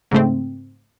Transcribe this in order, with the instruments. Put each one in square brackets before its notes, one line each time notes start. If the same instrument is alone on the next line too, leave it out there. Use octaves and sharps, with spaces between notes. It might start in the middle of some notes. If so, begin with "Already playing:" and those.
[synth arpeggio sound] G#2 C#3 A3 C4